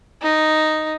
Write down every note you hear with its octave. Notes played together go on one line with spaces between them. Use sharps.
D#4